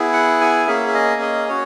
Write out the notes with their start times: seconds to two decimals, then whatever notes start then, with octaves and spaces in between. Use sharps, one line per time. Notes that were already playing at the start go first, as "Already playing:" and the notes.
Already playing: B3 E4 G#4
0.13 F#5
0.41 G#5
0.67 A#3 C#4 G#4 E5
0.88 E5
0.94 D#5
1.22 D#5
1.49 C#4 F#4 C#5